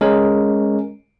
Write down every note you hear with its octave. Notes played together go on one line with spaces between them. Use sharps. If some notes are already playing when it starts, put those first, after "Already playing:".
G#3 C#4 A#4